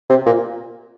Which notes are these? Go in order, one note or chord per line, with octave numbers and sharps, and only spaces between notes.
C3
A#2